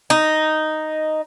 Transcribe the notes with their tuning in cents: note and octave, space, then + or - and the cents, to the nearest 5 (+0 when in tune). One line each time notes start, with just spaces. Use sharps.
D#4 +0